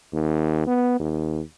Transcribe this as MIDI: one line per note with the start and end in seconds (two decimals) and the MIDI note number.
0.13 0.63 39
0.67 0.99 59
1.00 1.40 39